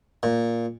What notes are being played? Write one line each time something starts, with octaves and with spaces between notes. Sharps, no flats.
A#2